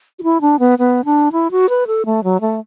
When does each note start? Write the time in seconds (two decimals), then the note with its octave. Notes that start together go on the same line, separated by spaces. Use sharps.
0.19 F#4
0.23 E4
0.41 D4
0.59 B3
0.79 B3
1.05 D4
1.32 E4
1.51 F#4
1.69 B4
1.87 A4
2.06 A3
2.24 F#3
2.41 A3